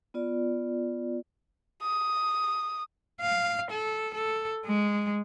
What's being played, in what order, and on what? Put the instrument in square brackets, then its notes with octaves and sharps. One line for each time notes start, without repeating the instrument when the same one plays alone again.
[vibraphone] B3 F4 D5
[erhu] D#6
[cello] F5
A4
A4
G#3